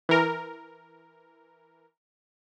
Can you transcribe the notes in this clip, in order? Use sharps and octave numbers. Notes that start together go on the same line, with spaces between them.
E3 A#4